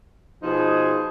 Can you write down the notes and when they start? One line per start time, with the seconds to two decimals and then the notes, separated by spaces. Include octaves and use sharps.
0.43 B2 F3 D#4 G#4